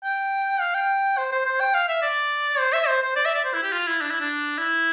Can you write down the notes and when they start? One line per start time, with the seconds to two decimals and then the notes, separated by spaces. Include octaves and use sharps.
0.04 G5
0.61 F5
0.74 G5
1.18 C5
1.32 C5
1.46 C5
1.60 G5
1.74 F5
1.89 E5
2.02 D5
2.59 C5
2.73 E5
2.88 C5
3.02 C5
3.16 D5
3.26 E5
3.35 D5
3.45 C5
3.54 E4
3.63 G4
3.73 F4
3.87 E4
4.01 D4
4.11 E4
4.20 D4
4.58 E4